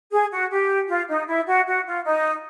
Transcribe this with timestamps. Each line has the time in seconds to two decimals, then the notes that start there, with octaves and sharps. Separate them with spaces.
0.11 G#4
0.32 F#4
0.51 G4
0.88 F4
1.09 D#4
1.27 E4
1.47 F#4
1.66 F#4
1.86 F4
2.04 D#4